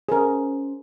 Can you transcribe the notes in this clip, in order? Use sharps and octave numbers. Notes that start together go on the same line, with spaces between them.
C#4 G#4 A#4 C5